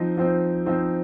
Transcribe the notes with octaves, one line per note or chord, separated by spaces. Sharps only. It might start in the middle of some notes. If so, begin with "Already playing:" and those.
Already playing: F3 C4 D#4
F3 C4 D#4
F3 C4 D#4